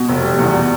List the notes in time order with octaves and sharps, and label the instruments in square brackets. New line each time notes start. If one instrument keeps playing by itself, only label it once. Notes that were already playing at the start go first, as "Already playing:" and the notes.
Already playing: [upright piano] B2
F1
G3
E2
B2